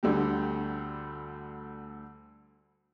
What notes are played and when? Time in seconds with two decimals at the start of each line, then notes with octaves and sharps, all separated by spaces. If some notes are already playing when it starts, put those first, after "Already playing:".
0.03 D2 D3 G3 G4